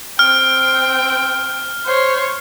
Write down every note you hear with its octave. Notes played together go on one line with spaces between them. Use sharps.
C4 G5 F6
C5 C#5